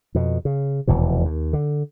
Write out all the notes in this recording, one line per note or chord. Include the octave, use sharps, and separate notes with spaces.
F2 B2
C#3
F1 E2 B2 E3
D#2
D3